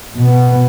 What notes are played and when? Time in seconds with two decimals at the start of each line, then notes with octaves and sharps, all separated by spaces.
0.17 B2 B3